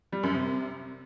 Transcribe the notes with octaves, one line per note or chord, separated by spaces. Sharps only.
G3
F#2
C3